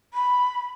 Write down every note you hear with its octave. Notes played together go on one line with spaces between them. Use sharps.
B5